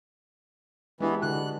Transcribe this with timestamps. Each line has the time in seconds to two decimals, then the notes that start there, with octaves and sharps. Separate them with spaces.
1.00 E3 G#3 B3 D4 G4
1.22 D3 F#4 F#6